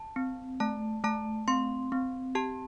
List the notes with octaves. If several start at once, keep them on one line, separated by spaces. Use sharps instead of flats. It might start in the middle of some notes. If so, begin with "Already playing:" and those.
Already playing: A5
C4
A3 A5
A3 A5
C4 C6
C4
G4 A5